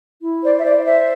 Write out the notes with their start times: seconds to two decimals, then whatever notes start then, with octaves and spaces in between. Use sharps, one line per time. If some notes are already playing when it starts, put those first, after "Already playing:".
0.21 E4
0.42 C5 D5
0.57 E5
0.64 C5 D5
0.85 C5 E5